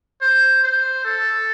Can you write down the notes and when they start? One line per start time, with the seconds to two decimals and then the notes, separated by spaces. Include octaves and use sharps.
0.22 C5
0.63 C5
1.04 A4